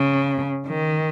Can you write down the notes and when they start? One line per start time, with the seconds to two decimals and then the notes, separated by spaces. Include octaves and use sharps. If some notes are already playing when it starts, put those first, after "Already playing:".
Already playing: C#3
0.67 D#3